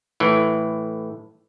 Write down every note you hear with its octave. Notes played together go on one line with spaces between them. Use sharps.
A2 E3